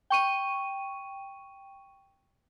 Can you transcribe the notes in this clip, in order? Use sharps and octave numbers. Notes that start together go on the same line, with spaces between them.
G5 C#6 D#7